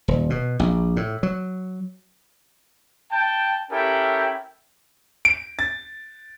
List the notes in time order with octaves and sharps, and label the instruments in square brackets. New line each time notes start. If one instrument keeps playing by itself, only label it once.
[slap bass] D#1
B2
A#1
A2
F#3
[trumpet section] G5 A5
C#4 E4 G4 A4 A#4 G5
[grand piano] D7
A6